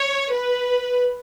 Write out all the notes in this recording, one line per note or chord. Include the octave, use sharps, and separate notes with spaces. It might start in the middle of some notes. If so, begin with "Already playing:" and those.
Already playing: C#5
B4